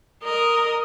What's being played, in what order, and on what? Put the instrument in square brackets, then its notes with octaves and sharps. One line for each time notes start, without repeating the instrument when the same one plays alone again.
[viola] A#4 D#5